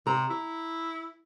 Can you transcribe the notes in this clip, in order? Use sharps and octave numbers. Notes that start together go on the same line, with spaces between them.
C3 A#5
E4